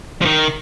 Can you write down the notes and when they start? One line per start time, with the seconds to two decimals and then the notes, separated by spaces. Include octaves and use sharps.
0.22 F3
0.25 D#3